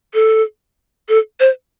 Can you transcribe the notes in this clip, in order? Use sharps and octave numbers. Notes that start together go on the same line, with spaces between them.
A4
A4
C5